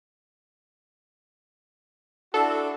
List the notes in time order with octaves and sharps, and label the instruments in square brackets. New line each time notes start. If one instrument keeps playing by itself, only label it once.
[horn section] D4 E4 F#4 [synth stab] A4